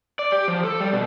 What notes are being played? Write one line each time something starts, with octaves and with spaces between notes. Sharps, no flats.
D5
G4
F3
A4
G3
B2